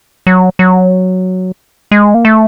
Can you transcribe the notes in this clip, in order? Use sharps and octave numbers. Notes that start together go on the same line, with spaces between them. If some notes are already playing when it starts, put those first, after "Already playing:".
F#3
F#3
G#3
A#3
A3